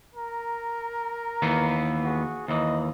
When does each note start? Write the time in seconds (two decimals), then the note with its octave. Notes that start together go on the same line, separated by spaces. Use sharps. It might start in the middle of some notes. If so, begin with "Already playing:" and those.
0.15 A#4 A#5
1.42 D#2 E3 B3
2.05 F#4 G#4
2.48 D#2 E3 D#5